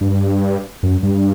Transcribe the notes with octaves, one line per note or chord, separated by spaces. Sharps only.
G2
F#2
G2